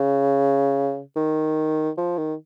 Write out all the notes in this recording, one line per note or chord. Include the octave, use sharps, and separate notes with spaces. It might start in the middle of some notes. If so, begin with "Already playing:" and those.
Already playing: C#3
D#3
F3
D#3